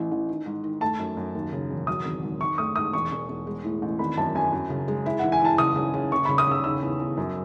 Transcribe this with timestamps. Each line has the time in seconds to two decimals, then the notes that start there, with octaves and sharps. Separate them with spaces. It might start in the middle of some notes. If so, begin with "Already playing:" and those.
Already playing: A1 E3
0.11 A1
0.29 D#3
0.46 G#2
0.64 D#3
0.81 A3 A5
0.99 F#2
1.17 F#2
1.35 D#2
1.53 C#3
1.70 E1
1.87 F#3 D#6
2.05 G#1
2.23 G#2
2.41 D#3 C#6
2.58 A3 D#6
2.76 G#2 D#6
2.93 E1 C#6
3.12 E1
3.29 E1
3.47 G#3
3.64 A2
3.82 A1
3.99 G#1 B5
4.17 F#2 A5
4.35 F#2 G#5
4.53 F#2
4.70 C#3
4.88 G#3
5.06 E4 E5
5.19 E3 F#5
5.32 G#5
5.42 E3 A5
5.58 F#1 D#6
5.76 C#3
5.94 C#3
6.11 F#1 C#6
6.25 C#3 B5
6.38 D#6
6.47 C#3 E6
6.64 D#3 E6
6.82 E2
7.00 E2
7.17 F#2